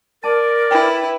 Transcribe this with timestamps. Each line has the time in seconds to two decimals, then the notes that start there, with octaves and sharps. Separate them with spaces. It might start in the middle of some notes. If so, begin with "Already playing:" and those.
0.24 A#4 D5 A5
0.71 E4 B4 G5